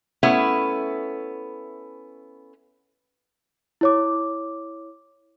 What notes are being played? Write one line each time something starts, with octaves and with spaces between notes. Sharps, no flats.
A3 B3 C#4 E4
E4 C#5 D6